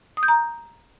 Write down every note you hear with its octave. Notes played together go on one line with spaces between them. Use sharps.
D#6
G6
A#5